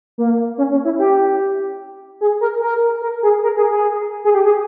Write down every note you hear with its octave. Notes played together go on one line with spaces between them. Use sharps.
A#3
C#4
C#4
E4
G4
G#4
A#4
A#4
A#4
G#4
A#4
G#4
G#4
G#4
G4
G#4